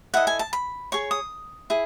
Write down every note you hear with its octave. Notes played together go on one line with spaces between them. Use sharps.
E4 A4 D#5 F#5
G#5
A5
B5
G#4 C#5 C#6
D#6
E4 G#4